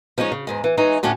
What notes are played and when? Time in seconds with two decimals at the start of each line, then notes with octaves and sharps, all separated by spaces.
0.18 F3 G#3 C#4 D#4 C#5
0.32 C#3
0.47 E2 G#2 G#3
0.64 E3
0.77 E3 G#3 D#4 C#5
1.03 D2 A2 C#4 D4 F#4 A5